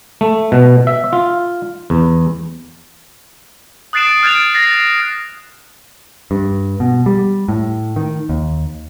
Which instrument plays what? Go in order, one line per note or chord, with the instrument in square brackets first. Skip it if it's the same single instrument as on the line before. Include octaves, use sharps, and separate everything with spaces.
[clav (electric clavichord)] A3
B2
E5
F4
E2
[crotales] D#6 F#6 A6 C7 D7 E7
F6 F#6 G#6 A6 D7 F7
A6 A#6 C7
[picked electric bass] G2
B2
G3
A2
D#3
D#2